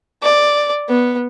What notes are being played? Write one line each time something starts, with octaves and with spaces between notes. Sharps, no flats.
D5
B3